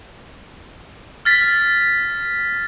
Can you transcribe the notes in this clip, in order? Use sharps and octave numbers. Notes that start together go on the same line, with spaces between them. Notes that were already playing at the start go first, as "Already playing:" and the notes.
F6 A6 B6